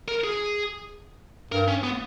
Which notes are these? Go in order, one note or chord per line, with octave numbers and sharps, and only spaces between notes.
A#4
G#4
G2 A#4
C#4
B3